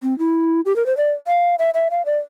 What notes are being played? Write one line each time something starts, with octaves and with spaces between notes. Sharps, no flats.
C4
E4
G4
A#4
C5
D5
F5
E5
E5
F5
D5